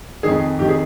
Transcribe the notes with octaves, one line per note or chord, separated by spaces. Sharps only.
F2 D#3 G#4
F2 D#3 G4
G#4